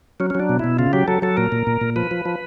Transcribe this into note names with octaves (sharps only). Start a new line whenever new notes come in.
F#3 C#4
C#4
F#3 D4
B2
B2 E4
C#3 F4
F#3 G4
F#3 A4
F#3 A4
A#2 A#4
A#2
A#2
A#2
F3 B4
F3
F3